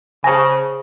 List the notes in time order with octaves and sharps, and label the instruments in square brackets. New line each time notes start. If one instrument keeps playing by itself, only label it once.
[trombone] C#3 [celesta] G#4 C5 A#6 [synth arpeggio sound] G#5 A5